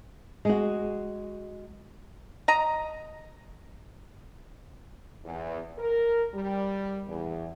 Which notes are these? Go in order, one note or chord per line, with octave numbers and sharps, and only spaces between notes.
G#3 F#4
D#5 A#5
E2
A#4
G3
E2